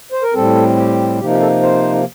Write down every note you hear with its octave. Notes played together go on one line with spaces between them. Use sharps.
C5
A#4
A2 G3 C4 A4
G4
C3 F3 A#3 D#4 G4
G4
A4
C5